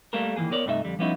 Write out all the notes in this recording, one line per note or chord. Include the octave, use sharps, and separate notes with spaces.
G3 A3 A#3 A4 A#4
D#3 E3 F#3 A#3 G#4
B3 A#4 C#5 D5
G2 C3 A3 D#4 A4 E5
F2 D3 G3
F3 G3 B3 C#4 D#4 E4